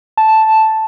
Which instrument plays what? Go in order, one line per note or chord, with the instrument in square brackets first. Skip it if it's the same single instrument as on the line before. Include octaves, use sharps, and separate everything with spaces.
[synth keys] A5